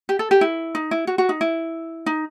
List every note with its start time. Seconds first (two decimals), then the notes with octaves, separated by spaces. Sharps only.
0.09 G4
0.19 A4
0.31 G4
0.41 E4
0.75 D#4
0.91 E4
1.07 F#4
1.18 F#4
1.29 D#4
1.41 E4
2.06 D#4